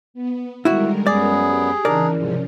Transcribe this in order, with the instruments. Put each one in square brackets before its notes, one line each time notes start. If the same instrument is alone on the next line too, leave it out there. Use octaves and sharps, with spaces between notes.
[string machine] B3
[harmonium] D3 D#3 [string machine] G3 G#3 A#4 [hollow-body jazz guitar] E4 F#4
[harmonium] F#2 B3 [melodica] G#4 [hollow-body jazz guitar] D5
[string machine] G4
[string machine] C#3 E3 [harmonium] D4 D#4 [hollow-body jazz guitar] A#4 D5
[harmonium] G#2 [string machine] C3 F3 C#4